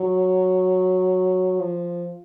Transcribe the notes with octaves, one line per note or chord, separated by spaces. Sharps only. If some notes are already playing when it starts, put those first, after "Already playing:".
Already playing: F#3
F3